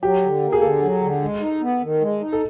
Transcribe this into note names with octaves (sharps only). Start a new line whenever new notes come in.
F#3 G4
D3
A#3
G#4
D3 A4
F#3
D3
G#3
D#4
B3
D#3
G#3
D#4
A4